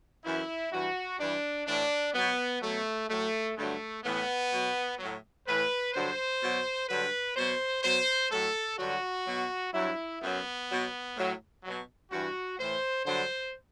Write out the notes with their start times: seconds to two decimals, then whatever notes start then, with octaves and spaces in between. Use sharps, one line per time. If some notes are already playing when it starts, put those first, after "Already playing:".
0.24 F#2 E3 E4
0.71 G2 E3 F#4
1.19 G2 E3 D4
1.67 A2 E3 D4
2.14 B2 F#3 B3
2.62 B2 F#3 A3
3.09 A2 F#3 A3
3.57 G2 D3 F#3 A3
4.04 A2 E3 B3
4.51 B2 F#3
4.99 F#3
5.04 A2
5.46 A2 E3 B4
5.93 G2 D3 F#3 C5
6.41 B2 F#3
6.88 G2 D3 F#3 B4
7.36 B2 F#3 C5
7.83 B2 F#3 C5
8.31 A2 F#3 A4
8.79 G2 D3 F#3 F#4
9.26 B2 F#3
9.74 G2 F#3 E4
10.21 F#2 F#3 B3
10.69 B2 F#3
11.16 A2 F#3
11.64 B2 F#3
12.11 G2 E3 F#4
12.59 A2 E3 C5
13.06 G2 D3 F#3 C5